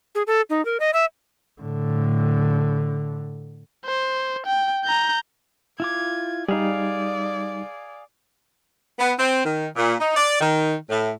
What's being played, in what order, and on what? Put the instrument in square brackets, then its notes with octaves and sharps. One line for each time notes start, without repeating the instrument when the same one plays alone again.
[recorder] G#4
A4
D#4
A#4
D#5
E5
[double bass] A2 D3
[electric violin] C5
G5
A#5 G6
[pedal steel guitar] E4 F4 D6 [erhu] G#6
[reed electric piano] G3 D#4 [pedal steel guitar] G#4 F5 [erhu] D5
[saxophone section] B3
C4
D#3
A#2
D#4
D5
D#3
A2